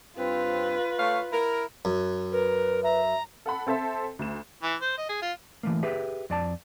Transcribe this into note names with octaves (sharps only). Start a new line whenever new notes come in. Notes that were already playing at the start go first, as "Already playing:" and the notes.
G2 C4 F4 B4
A3 C#5 F5
E4 A#4
F#2
A#4 B4
E5 A#5
A4 F#5 B5
C4 A4 C5 E5
D2 E7
E3
C5
D#5
G#4
F4
E3 A3 A#3
G4 G#4 B4 E5
F2 D5 A5